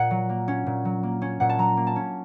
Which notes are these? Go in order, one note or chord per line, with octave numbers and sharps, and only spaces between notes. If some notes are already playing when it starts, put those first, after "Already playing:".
Already playing: A#2 F#5
F#3
A#3
C#4
A#2
F#3
A#3
C#4
A#2 F#5
A5
F#3 A#5
A#3
A5
C#4